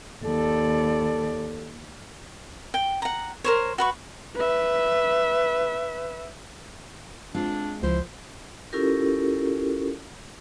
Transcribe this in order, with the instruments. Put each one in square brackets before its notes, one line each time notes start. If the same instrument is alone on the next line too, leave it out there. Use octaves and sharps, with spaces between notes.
[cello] D#2 D5 [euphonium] A4
[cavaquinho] G5
F#5 A#5
A#4 C5 C#5
F#4 B4 C#6
[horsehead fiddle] B4 E5
[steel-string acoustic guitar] G#3 C4 F4 [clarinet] D4
[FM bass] C#2 [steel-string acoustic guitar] F3 E4 [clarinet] C5
[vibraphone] C#4 E4 F4 G4 A4 A#4